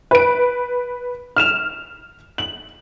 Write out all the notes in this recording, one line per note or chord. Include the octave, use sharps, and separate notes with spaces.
B4 D7
F6 E7 F7
F#7